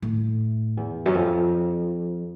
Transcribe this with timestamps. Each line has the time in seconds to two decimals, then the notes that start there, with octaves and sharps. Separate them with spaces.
0.02 A2
0.77 E2
1.06 F#2
1.14 F2